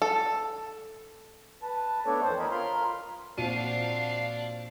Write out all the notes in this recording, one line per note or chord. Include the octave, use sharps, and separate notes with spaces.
A4
B4 A5
A3 B3 D4 A4 C#5 D5
F2 E3 C4 C5
A#4 C#5 D#5 B5
F4 A#4 B5 C6 F6
A#2 C4 D4 F4 F#4 F5 D#7